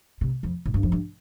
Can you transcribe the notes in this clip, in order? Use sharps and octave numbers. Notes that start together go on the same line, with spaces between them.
C3
F2
A2
G2
F2
G2